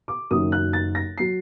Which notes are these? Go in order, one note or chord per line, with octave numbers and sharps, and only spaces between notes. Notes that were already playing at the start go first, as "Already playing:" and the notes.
D6
F#1 F#2 D#3 D#6
F#6
A6
A#6
F#3 C7